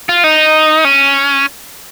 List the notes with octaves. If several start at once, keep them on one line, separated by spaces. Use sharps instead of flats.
F4
D#4
C#4